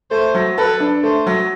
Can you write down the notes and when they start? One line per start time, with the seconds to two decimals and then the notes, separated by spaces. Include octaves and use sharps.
0.11 A3 C5
0.35 F#3
0.58 A4 B4
0.80 D4
1.03 A3 C5
1.27 F#3